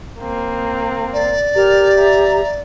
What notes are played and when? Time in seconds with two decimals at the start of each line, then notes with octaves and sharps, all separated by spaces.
0.20 A#3 C4
1.13 D5
1.55 G4 A#4 F6
1.96 E5 A#5